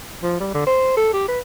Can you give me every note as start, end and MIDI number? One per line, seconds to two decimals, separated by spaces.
0.23 0.38 53
0.40 0.49 55
0.54 0.64 50
0.67 0.95 72
0.97 1.12 69
1.13 1.25 67
1.28 1.39 71